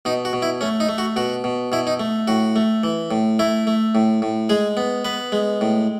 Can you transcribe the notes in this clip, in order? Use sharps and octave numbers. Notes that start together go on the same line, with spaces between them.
B2 D#4
F#4
B2
E4
A3 C#4
D#4
A3
F#4
B2 F#4
B2
B2 E4
D#4
A3
A2 F#4
A3
E3
A2
A3 E4
A3
A2
A2
G#3 G#4
B3
B3 B4
G#3
A2